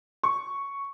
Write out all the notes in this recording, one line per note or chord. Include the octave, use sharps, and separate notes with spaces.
C#6